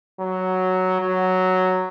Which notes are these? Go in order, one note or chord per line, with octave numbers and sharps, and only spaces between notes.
F#3
F#3